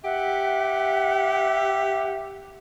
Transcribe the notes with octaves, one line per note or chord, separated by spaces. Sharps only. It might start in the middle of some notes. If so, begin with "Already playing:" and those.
G4 E5 F#5